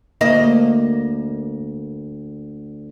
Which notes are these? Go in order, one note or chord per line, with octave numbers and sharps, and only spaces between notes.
D2 A#3 D#5